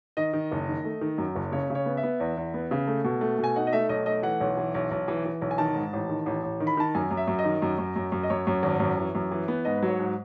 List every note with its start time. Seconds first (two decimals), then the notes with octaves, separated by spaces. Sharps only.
0.17 D#3 D#5
0.33 D#3
0.52 F#1
0.68 D#3
0.84 A3
1.01 D#3
1.18 F#2
1.35 F#1
1.52 C#3 C#5
1.70 C#3
1.75 C#5
1.86 B3
1.97 E5
2.03 B3
2.20 E2
2.37 E2
2.54 B3
2.71 C#3
2.87 A3
3.04 B2
3.21 A3
3.39 B2
3.44 G#5
3.56 D#4 F#5
3.67 D#5
3.73 A3 E5
3.89 B1 D#5
4.06 A3 D#5
4.23 E3 F#5
4.40 B1
4.57 E3
4.74 B1
4.91 B1
5.08 E3
5.25 E3
5.42 B1
5.51 G#5
5.58 D#3 A5
5.75 G#2
5.93 A1
6.09 D#3
6.26 A1
6.43 A1
6.60 D#3
6.67 B5
6.77 D#3 A5
6.95 F#2 G#5
7.11 F#2
7.17 E5
7.28 F#2
7.39 D#5
7.44 D#3
7.62 F#2
7.78 F#2
7.96 F#2
8.12 F#2
8.23 D#5
8.30 F#2 C#5
8.47 F#2
8.63 G#1
8.80 F#2
8.97 E3
9.15 F#2
9.31 E3
9.48 B3
9.65 G#2 D#5
9.77 B4
9.82 F#3
9.88 C#5
9.99 G#2